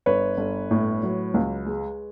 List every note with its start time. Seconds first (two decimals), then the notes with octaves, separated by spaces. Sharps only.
0.06 G1 B4 C#5
0.37 G1
0.71 A2
1.03 F#3
1.34 C#2
1.66 G#3